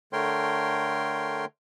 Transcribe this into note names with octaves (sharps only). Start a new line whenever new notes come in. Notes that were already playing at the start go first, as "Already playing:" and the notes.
D3 A3 A#4 C#5 G5 C6